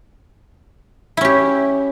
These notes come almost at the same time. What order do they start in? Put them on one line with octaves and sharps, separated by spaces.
E4 C#4 G4